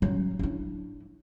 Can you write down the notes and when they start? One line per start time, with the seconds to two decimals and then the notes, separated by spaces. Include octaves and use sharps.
0.02 F#3 C#4
0.39 D4 E4